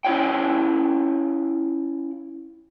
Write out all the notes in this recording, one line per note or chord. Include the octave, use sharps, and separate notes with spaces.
C#4 E4 F4 C#5 G5